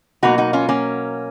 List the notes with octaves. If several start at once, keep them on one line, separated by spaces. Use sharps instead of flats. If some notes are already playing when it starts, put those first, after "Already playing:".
B2 F#3 A#3 D#4 F#4
D#4 F#4
C#4 F4
A#3 C#4